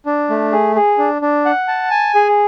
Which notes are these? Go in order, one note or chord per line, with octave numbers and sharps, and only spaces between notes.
D4
A3
G#4
G#4
D4
D4
F#5
A5
G#5
G#4